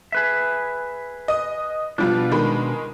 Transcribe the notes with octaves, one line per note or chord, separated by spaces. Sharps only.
G#4 B4 E5
D#5 D#6
B2 F3 G3 D4 F4
D#3 G#3 B5